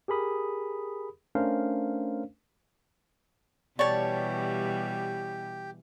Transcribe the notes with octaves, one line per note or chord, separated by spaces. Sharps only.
G4 G#4 A#4 B5 D#6
A3 C#4 D4 A#4 C5 F5
B2 E3 G3 G4 C#5 D5 A5